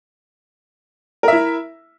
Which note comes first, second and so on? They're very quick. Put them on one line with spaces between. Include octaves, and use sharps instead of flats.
A#4 E5 E4